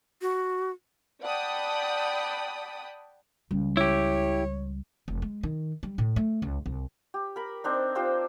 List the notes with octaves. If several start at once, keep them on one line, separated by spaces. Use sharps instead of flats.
F#4
D5 F#5 G5 A5 B5 D#6
C#2 G3
E4 G4 C#5
F1
G#3
D#3
G3
A2
A3
C#2
C2
G4
A#4 B5
C4 D4 D#4
F4 G4 C5 G5